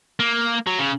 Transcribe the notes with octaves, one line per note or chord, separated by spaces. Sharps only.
A#3
F#3
C#3